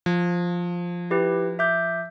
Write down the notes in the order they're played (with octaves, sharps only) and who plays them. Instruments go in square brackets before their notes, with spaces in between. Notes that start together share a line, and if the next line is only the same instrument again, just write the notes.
[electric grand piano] F3
[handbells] E4 G4 B4
E5 D6 G6